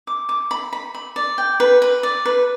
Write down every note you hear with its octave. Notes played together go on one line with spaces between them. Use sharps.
D6
D6
B5
B5
B5
D5
G5
B4
B4
D5
B4